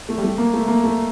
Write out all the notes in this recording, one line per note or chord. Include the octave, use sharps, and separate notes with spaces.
A3
G3
A3
A#3
A3
A#3
A3